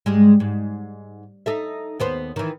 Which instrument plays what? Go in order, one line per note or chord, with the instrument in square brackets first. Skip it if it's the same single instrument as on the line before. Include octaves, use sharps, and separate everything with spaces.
[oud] G#2 G3 G#3
G#2
D#4 A4 E5
D#2 B3 C5
D#3 E3